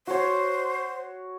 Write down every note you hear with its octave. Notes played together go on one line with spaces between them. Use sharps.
F#4 C5 C#5